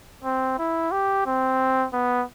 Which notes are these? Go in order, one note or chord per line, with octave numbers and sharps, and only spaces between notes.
C4
E4
G4
C4
B3